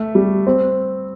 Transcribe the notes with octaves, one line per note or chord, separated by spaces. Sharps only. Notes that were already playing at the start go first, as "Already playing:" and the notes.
Already playing: A3
G3
C4